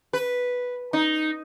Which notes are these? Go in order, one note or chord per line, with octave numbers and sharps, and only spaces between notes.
B4
D#4